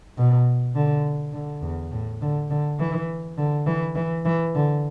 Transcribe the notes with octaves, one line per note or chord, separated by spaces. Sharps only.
B2
D3
D3
E2
A2
D3
D3
E3
D3
E3
E3
E3
D3